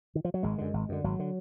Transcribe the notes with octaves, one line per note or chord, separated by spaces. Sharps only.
D#3
F3
F#3
G#1 G#3
F#2 D3
G#1
F#2 D3
G#1 F#3
D3